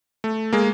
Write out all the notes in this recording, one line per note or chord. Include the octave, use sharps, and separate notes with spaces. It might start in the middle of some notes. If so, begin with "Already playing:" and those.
A3
G#3 A#3